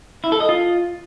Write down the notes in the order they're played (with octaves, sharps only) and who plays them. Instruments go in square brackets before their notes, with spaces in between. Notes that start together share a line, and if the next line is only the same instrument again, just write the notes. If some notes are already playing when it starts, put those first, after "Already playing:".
[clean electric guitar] E4
A4
D#5
F4